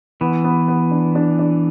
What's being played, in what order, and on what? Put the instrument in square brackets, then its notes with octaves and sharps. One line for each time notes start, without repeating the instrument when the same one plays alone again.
[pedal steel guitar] E3 [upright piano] B3
[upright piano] B3
B3
D4
D4
D4